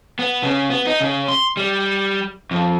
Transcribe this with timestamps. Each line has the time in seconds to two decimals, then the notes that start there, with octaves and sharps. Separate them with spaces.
0.19 B3
0.43 C#3
0.70 B3
0.87 D#4
1.01 C#3
1.28 C6
1.57 G3
2.51 F2